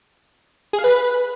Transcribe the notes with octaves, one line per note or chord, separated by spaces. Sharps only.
G#4
F5
B4